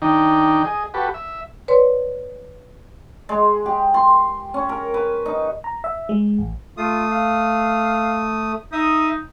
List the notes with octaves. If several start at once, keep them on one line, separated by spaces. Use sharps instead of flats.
D#3 D4 D#4 G5
G#4 D#5
F#4 G4 A4 B4
E5
B4 C#5 D5 C6
G#3
G4
C6
C#4
A#4
B4
D#4
A#5
E5
G#3
A1
A3 F4 D#6
F5
D#4 E5 D#6